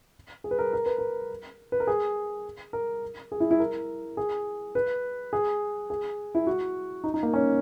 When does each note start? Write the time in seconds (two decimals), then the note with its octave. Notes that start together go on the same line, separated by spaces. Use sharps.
0.44 G#4
0.51 B4
0.59 A#4
0.73 A#4
0.86 B4
0.98 A#4
1.72 B4
1.80 A#4
1.87 G#4
2.73 A#4
3.32 G#4
3.40 E4
3.51 E4
3.60 A#4
4.17 G#4
4.75 B4
5.33 G#4
5.90 G#4
6.35 E4
6.47 F#4
7.04 D#4
7.14 D#4
7.23 A#3
7.34 C#4